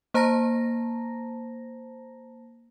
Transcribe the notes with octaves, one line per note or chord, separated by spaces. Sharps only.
A#3 C5 A5 A#5 A#6